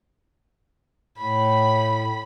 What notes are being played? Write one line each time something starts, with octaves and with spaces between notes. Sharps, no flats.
A2 B5